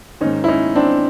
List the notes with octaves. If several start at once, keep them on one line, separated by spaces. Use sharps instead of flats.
G#2 D#3 C#4 D#4
E4
C#4 D#4
C4 D4